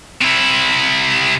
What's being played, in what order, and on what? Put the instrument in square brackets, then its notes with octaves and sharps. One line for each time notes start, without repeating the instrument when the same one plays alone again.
[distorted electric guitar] C3 E4